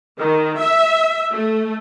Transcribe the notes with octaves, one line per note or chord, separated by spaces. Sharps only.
D#3
E5
A3